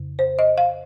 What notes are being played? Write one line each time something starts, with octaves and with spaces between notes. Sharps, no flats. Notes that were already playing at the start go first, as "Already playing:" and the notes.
Already playing: F2 C#3
C5
D#5
F5